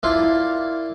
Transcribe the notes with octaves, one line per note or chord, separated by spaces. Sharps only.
A#3 D4 E4 F4